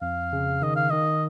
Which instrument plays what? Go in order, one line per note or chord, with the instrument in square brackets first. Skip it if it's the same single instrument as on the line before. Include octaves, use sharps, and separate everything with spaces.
[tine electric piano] F2 [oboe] F5
[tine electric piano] C#3
[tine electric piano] D#3 [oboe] D#5
[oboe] F5
[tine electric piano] D#3 [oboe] D#5